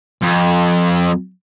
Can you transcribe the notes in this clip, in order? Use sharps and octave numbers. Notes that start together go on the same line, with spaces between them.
F2